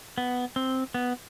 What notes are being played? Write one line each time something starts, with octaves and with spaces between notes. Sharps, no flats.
B3
C4
B3